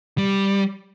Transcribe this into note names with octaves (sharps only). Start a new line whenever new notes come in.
G3